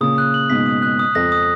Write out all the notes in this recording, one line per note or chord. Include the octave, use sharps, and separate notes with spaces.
A#2 C#3 D#6
F#6
F#7
G#2 B2 B6
D#6
F#6
D#6
F2 A#6
D#6